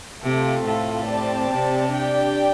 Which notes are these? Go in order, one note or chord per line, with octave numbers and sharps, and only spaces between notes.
C3 A3 C4 F4 A4
A2
C4 G4 D5 A5
C3
D4 G4 D5 G5